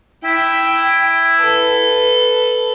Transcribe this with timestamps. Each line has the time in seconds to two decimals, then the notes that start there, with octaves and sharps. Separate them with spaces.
0.25 E4 G5
1.38 A4 B4